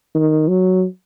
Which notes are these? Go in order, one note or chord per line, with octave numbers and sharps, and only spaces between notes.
D#3
F#3